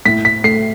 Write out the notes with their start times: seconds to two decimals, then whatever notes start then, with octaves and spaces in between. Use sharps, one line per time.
0.05 A2 B6
0.25 B6
0.44 A3 C7